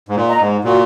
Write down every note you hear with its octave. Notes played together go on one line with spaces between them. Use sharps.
G#2
A#2
D#5 A#5
G#2
A#2 F#4